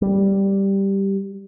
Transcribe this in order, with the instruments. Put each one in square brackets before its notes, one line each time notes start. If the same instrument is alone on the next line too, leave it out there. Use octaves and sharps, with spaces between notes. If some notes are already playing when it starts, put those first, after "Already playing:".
[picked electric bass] G3